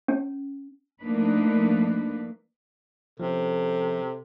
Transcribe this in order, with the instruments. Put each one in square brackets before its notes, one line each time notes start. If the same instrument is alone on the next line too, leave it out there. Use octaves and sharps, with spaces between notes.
[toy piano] C#4
[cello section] F3 A3 A#3 D4 D#4 B4
[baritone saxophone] C3 [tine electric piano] F3 C#4 [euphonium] A4